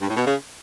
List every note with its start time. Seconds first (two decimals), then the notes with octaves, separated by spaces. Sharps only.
0.01 G2
0.09 A2
0.17 B2
0.26 C#3